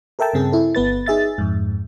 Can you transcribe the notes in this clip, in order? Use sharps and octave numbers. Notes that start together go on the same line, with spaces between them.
A4 A#4 E5 G5 A5
G2 C#3 C4 G#4
E4 A4
G1 B3 B4 A6
D#4 G#4 E5 A6
F2 G#2